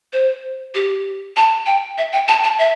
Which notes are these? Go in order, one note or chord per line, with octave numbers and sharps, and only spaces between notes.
C5
G4
A5
G5
E5
G5
A5
A5
E5